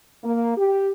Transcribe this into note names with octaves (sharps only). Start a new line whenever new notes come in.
A#3
G4